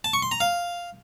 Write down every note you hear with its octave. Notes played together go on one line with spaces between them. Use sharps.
A5
C#6
C6
A#5
F5